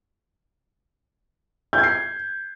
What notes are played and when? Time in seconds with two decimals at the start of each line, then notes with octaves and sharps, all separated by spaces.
1.73 G6
1.78 G#6
1.83 C7